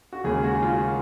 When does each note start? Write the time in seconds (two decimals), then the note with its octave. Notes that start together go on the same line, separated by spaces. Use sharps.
0.13 F#4
0.24 D#2 C#3 G#3 G#4
0.44 F#4
0.62 F4